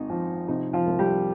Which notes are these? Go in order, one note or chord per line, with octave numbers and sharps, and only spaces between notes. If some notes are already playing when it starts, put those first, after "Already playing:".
Already playing: G#1 D#4
F3
C3 D#4
F3 F4
C2
G3 G4